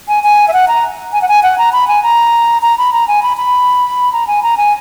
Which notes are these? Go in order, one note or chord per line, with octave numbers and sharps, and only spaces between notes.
G#5
G#5
E5
F#5
A#5
G#5
F#5
G#5
F#5
A#5
B5
G#5
A#5
A#5
B5
A#5
G#5
B5
B5
A#5
G#5
A#5
G#5